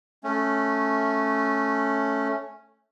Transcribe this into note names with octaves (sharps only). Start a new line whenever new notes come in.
A3 C#4